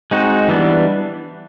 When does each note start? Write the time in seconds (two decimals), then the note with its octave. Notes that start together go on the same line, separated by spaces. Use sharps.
0.11 G#3 C4 D#4 F#4
0.48 E3 G3 B3 D4